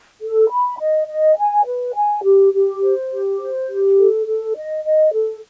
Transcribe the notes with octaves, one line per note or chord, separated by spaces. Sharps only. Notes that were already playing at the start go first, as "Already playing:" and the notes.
A4
B5
D#5
D#5
G#5
B4
G#5
G4
G4
C5
G4
C5
G4
A4
A4
D#5
D#5
A4